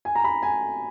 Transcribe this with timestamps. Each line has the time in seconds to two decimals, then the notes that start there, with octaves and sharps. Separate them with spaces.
0.05 G#5
0.15 A#5
0.24 B5
0.43 G#5